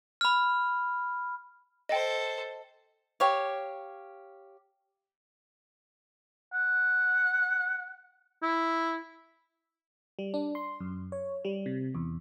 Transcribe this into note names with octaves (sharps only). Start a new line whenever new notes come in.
B5 F6
A4 C5 D#5 G5
G4 C#5 F5
F#5
E4
G3
D4
C6
F#2
C#5
G3
C3
E2